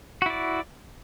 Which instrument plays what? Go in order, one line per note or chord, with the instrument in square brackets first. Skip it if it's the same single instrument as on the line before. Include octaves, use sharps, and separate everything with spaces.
[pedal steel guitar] F#4
E4
D5